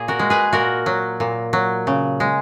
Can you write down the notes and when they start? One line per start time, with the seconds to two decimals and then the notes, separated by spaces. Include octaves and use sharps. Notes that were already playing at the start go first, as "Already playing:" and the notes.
Already playing: A#2 G#4
0.08 F#4 A#4
0.19 G#3
0.30 G#4 B4
0.53 A#2 F#4 A#4
0.86 F#3
1.20 A#2
1.53 F#3
1.87 C#3
2.20 G#3